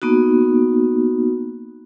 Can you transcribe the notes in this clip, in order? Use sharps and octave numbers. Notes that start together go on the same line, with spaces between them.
A#3 B3 D#4 F#4